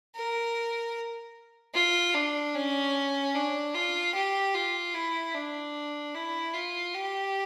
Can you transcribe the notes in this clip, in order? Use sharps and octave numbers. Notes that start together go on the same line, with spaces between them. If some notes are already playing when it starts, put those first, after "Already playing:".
A#4
F4
D4
C#4
D4
F4
G4
F4
E4
D4
E4
F4
G4